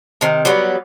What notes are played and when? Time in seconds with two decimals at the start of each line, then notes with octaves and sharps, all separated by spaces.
0.21 C3 D#3
0.45 F#3 G3 B3